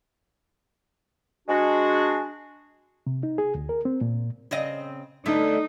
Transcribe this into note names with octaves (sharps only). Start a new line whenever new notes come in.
G#3 D4 F#4
C3
D#4
G#4
D2
A#4
C4
A#2
C#3 C4 D#5
D3 A3 B3 D#4